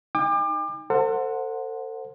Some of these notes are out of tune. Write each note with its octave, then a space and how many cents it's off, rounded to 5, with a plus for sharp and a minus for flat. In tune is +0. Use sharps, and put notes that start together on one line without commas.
D#4 +0 G5 +45 D6 +35
A4 +40 C5 +0 F#5 -15